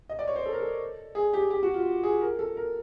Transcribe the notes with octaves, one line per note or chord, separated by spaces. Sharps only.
D#5
D5
C#5
C5
A4
A#4
A4
G#4
G4
G4
F#4
F4
G#4
A#4
A4
A#4